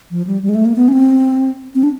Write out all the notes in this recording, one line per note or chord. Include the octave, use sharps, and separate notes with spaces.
F3
G3
G3
G#3
A3
A#3
B3
C#4
C4
C4
D4